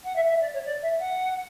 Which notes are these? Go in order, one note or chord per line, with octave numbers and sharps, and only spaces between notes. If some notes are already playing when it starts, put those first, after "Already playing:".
F#5
E5
E5
D5
C#5
D5
E5
F#5